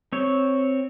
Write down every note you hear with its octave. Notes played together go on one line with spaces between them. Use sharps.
C4 C#5